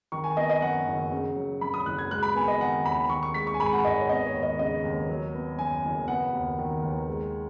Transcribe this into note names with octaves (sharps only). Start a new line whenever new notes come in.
D#3 C#6
G#5
B3 D#5
D#5
F#2 F#5
F#1
C#3
F#3
F#2 B5
D#6
F#1 F#6
G#6
G#3 F#6
B5
B3 G#5
D#5
D#3 F#5
D#2 B5
D#3 C#6
C#6
G#3 B6
C#6
G#5
G#2 B5
F#5
G#1 D#5
C#5
B3 D#5
C#5
D#2
D#5
C#3 D#5
D#2
F#3
B3
F#2 G#5
F#1
B3 F#5
D#2
D#3
D#2
G#3